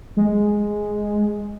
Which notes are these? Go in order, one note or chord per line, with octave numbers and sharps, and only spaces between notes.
G#3